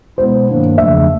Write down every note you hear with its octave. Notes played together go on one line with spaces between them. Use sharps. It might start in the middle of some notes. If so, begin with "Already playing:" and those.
B2 G#3 B3 E4 C5
G2 D#3 F#3 A#3 D4
E2 C#3 F3 A3 D4 E5